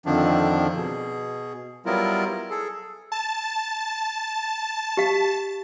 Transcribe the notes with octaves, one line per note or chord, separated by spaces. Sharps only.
F2 D3 D#3 F3 D4
B2 G#4
F#3 G3 B3 E4 F4 A#4
G#4 A4
A5
G4 F5